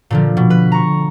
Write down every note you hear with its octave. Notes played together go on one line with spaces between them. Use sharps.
A#2 D3 F3
B2
B4
A#5 C#6